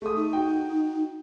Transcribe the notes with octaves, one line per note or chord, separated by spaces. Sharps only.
A3 G#4 D#6
D#4
F#4 G5